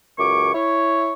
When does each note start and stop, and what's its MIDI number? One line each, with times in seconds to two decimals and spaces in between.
0.19 0.53 37
0.19 0.53 42
0.19 0.53 73
0.19 0.53 85
0.19 0.53 86
0.54 1.13 64
0.54 1.13 73